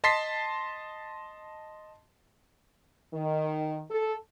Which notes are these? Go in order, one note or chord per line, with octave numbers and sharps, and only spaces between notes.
D#5 A5 C6 A6 B6 C7
D#3
A4